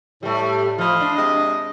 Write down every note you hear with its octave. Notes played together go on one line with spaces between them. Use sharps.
A2 G3 A3
F3 E4 D#5 F5
D4
C3 G#3 D#5